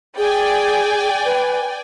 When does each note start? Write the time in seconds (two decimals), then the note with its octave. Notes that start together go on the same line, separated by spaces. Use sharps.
0.18 G#4 D5 G5 G#5
1.25 B4